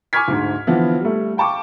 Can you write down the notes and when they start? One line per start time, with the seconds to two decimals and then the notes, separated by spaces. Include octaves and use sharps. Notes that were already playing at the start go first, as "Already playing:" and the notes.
0.13 G#5 C#6 D6 F6 G#6 B6
0.28 D2 G#2
0.67 D3 E3 F3 B3
1.00 G3 A3
1.37 F5 G5 A5 C#6 D6